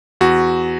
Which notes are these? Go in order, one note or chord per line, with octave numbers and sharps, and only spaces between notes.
E2 F#4